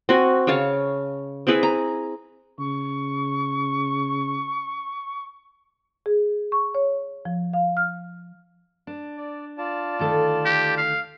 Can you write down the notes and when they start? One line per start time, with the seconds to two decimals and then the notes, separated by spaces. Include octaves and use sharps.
0.09 C4 F#4 G#5
0.47 C#3 C#5 F5 A5
1.47 C4 E4 G#4 B4
1.63 A#5
2.59 C#3 C#6
6.06 G#4
6.52 C#6
6.75 C#5
7.25 F3
7.53 F5
7.77 F6
8.87 D4
9.17 D5
9.58 F4 D5 A5
9.99 D2 D#3 A4
10.45 G4
10.77 F5